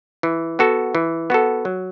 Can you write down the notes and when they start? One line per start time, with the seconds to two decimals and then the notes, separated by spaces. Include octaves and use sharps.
0.23 E3
0.59 B3 F#4 A4
0.95 E3
1.30 B3 F#4 A4
1.65 F#3